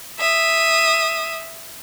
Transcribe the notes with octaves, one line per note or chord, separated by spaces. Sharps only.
E5 D#6